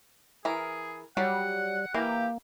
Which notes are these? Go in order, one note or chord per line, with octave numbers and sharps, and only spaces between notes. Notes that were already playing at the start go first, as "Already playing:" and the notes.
E3 G#4 A#4
F#3 G3 F#5
E3 A#3 G4